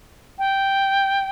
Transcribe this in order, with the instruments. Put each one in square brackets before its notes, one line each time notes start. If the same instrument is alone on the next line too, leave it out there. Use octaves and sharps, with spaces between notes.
[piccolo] G5